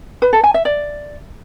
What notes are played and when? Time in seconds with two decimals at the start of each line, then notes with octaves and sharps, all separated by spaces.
0.22 B4
0.33 A4
0.44 G#5
0.54 E5
0.65 D5